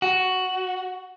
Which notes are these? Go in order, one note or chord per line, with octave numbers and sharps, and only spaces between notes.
F#4